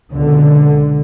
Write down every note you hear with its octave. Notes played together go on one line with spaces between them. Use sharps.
C#2 B2 D3